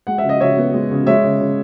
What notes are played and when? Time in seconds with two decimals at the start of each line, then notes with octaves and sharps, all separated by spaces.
0.07 G#3 F#5
0.18 E5
0.23 C#3
0.29 D#5
0.40 C#3 C#5 E5
0.57 B3
0.74 G#3
0.91 C#3
1.07 G#3 C#5 E5
1.24 C#3
1.41 C#3